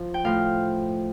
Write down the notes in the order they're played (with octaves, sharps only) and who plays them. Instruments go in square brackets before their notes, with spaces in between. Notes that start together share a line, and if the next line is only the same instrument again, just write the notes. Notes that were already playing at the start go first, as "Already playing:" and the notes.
Already playing: [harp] F3
G5
A2 F3 F5